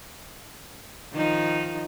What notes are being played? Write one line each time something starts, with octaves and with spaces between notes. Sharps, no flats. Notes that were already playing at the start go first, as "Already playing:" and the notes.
D#3 F3 D#4